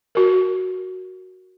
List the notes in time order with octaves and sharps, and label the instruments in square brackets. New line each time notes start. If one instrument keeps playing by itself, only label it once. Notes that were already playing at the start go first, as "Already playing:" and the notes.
[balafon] F#4 A#4